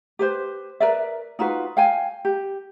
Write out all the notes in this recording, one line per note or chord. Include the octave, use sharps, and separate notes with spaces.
G4 B4 C5
A#4 B4 D5 E5
D#4 F4 F#4 B4
F5 G5 G#5
G4